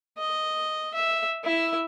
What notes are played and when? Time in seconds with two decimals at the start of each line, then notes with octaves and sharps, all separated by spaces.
0.18 D#5
0.95 E5
1.44 E4 E5